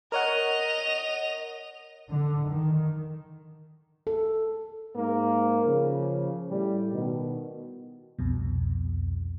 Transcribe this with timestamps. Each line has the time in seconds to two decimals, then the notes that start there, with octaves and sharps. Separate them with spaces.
0.12 A#4 C#5 D#5 F#5 F7
2.12 D3
2.51 D#3
4.07 A4
4.96 G#2 A#3
5.66 C#3 F3
6.51 A2 G3
6.93 B2 D#3
8.19 C2 F2 B2